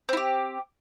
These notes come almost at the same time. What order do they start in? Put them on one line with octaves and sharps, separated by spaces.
C4 E4 G4